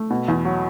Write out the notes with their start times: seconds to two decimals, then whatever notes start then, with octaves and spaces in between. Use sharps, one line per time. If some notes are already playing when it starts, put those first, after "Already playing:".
Already playing: A3
0.10 B2
0.28 E2
0.45 F#3